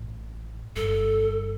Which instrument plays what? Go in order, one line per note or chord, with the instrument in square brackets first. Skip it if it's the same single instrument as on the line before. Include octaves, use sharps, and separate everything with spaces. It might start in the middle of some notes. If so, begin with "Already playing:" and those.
Already playing: [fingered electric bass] A1 A2
[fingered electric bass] G1 G2 [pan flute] A4